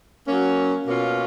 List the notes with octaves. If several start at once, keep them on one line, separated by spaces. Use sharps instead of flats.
F#3 A#3 C#4
B2 A#3 C#4 F4